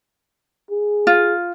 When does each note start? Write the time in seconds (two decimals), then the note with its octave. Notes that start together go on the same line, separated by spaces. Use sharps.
0.71 G#4
1.07 F4